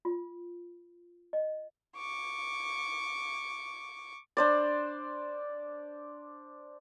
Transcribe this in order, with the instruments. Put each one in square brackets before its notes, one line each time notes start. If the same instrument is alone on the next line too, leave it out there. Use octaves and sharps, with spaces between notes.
[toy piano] F4
D#5
[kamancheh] C#6 D6
[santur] D4 C5 D5